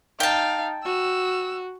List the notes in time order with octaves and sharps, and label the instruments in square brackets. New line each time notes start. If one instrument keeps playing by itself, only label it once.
[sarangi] D#4 [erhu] F5 [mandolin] G5 A5
[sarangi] F#4 [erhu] E6